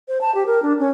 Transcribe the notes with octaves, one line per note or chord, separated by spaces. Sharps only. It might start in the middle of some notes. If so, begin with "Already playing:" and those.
C5
A5
G4
A#4
D4
C#4